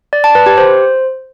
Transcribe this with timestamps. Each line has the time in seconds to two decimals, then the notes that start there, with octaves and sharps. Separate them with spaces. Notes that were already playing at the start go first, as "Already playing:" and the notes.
0.13 D5
0.24 A5
0.35 B4
0.46 G4
0.58 C5